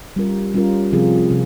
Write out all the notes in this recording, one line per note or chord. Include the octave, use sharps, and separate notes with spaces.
G3 C#4 F4 A#4
G3 C#4 F4 A#4
C3 F3 C4 F4 G#4
C3